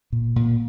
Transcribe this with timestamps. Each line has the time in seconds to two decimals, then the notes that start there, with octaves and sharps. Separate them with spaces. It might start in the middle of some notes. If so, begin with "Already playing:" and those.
0.12 A#2
0.36 A#2